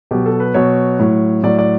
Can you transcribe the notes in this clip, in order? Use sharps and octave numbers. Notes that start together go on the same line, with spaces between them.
B2 F#3 G4
A4
B4
B2 F#3 C#5
A2 F#3
A2 F#3 D5
D5